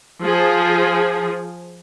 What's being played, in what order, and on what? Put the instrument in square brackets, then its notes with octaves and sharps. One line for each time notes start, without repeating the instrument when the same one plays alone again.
[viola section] F3 G#4